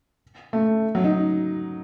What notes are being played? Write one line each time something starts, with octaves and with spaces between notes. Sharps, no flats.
A3
F#3
D#4